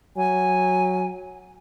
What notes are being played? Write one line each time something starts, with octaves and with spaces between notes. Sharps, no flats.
F#3 G#5